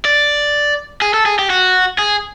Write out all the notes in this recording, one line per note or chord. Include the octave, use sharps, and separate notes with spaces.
D5
G#4
A4
G#4
G4
F#4
G#4